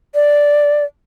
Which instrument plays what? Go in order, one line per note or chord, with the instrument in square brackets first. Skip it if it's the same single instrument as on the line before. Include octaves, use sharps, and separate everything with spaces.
[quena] D5